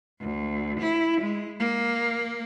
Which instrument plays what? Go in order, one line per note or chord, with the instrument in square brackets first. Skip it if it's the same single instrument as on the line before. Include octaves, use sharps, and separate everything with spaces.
[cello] D2
E4
G#3
A#3